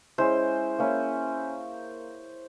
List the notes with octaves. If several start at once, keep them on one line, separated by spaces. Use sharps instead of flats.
G#3 C#4 E4 C5
A#3 C#4 E4